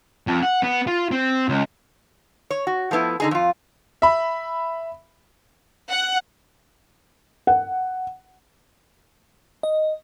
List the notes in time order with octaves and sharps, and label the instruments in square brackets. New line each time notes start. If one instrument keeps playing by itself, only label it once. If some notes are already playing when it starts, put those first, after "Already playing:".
[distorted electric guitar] F2
F#5
B3
F4
C4
C#2
[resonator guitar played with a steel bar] C#5
F#4
F3 A3 B3 E4
D3 D#4 G#4
F2 F4
[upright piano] E5 B5
[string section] F#5
[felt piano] F#5
[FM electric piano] D#5